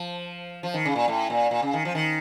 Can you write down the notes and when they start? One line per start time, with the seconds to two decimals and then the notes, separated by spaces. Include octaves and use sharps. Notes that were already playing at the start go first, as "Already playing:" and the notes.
Already playing: F3
0.63 F3
0.74 D#3
0.85 C#3
0.96 A#2
1.08 A2
1.30 A#2
1.51 A#2
1.62 C#3
1.73 D#3
1.85 F3
1.95 D#3